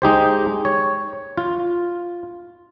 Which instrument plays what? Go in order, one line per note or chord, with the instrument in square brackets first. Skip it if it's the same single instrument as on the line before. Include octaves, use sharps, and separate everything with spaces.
[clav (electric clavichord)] G#3 D#4 G4 C5
C#5
F4